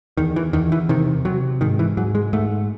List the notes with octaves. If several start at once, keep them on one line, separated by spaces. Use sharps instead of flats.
E2 D#3
E3
E2 D#3
E3
C3 D#3
C3 F#3
G#2 D#3
E3
G#2 F#3
G#3
G#2 A3